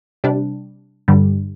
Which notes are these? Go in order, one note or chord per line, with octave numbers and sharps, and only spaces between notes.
C3 G3 D4
G2 D3 G3